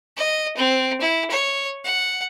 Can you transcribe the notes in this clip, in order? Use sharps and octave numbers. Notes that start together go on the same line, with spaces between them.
D#5
C4
E4
C#5
F#5